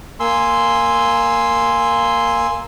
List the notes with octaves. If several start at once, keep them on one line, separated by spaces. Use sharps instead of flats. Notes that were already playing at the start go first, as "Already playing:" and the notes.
A#3 G#5 C6 E6